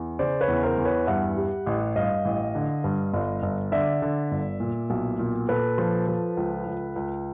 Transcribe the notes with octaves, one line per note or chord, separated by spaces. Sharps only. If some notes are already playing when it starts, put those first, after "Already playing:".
Already playing: E2
C#3 C5 D5
B4 C#5
E2
A#4 C5
E2
B4 C#5
G2 E5 F#5
G3
A1
G2 D#5 F5
A1
D3
G2
G1
G1
D3 D5 E5
D3
G1
A#2
B1
A#2
A#2 A4 B4
F3
F3
C#2
C#2
C#2